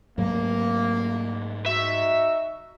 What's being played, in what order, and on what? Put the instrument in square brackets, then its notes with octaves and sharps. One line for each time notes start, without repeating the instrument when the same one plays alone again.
[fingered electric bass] G#2 F#3 A3 [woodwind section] A#3
[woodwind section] D#4 F#4 [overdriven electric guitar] E5